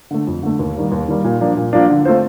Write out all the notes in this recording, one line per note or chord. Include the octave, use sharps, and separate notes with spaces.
D3 A3
F2
D3 A3
D#2
D#3 G3 A#3
D#2
D#3 G3 A#3
A#2
F3 A#3 D4
A#2
F3 A#3 D4
D3
A3 C4 F4 C5